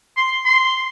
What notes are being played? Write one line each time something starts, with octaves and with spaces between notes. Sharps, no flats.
C6
C6